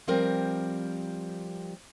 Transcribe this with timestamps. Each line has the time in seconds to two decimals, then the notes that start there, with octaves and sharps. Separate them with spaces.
0.07 F3 G3 C4 A#4